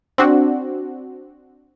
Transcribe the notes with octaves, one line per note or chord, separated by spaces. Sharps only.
C4 D4 F#4